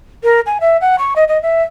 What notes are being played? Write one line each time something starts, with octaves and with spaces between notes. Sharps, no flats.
A#4
G#5
E5
F#5
C#6
D#5
D#5
E5